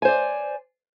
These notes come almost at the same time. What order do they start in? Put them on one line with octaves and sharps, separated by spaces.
G#5 C5 D5